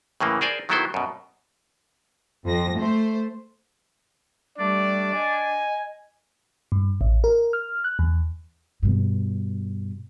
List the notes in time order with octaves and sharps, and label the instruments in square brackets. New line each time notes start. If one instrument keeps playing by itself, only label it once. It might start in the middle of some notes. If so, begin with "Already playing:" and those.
[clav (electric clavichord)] A2 C#3 E3 A#3
G#4 A#4 C5 D5 G#5
D#3 F#3 B3 E4 A4 C5
F#2 B2
[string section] F2 A#6
A3 C5
[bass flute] G3 [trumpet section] A3 D5 [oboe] D4
[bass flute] D#5 [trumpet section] G#5
[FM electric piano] G2
A1
A#4
F6
F#6
E2
[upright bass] G2 B2